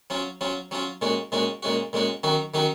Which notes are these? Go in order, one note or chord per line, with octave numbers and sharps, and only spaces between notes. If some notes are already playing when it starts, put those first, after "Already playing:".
F#3 C#4 F4
F#3 C#4 F4
F#3 C#4 F4
A#2 G#3 C#4 F#4
A#2 G#3 C#4 F#4
A#2 G#3 C#4 F#4
A#2 G#3 C#4 F#4
D#3 F#3 C#4 F#4
D#3 F#3 C#4 F#4